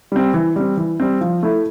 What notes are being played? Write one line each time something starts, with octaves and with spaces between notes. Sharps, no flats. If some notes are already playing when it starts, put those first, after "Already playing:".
G3 C4
E3
G3 C4
E3
G3 C4
F3
A3 E4 A4